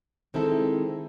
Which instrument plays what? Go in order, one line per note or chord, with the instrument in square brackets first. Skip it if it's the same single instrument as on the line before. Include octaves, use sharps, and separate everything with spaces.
[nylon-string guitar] D#3 G#3 C4 E4 A4